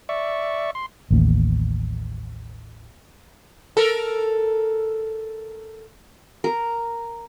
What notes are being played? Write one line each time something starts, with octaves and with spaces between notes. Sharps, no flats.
D5 E5 C#6
C6
A1 D#2
A4 A#4
A#4